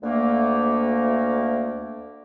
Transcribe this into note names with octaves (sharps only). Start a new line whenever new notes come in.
D2 A3 A#3